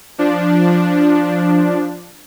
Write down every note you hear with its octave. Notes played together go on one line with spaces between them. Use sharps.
F3 D4